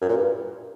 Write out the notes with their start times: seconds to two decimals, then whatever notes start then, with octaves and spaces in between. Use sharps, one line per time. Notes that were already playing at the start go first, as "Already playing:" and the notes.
0.02 F#2
0.09 A#2
0.17 G2